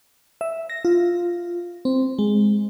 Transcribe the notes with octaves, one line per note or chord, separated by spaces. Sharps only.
E5
A#6
F4
C4
G#3